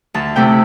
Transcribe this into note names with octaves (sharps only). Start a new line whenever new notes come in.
D2 A5
C3 A3 E4 G5